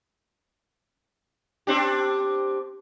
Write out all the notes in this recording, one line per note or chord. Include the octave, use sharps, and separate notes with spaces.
C4 D4 G4